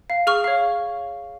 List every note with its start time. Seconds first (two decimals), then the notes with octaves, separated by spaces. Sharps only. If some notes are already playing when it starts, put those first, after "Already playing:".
0.10 F5
0.27 G#4 C#6 F6
0.44 C#5 F5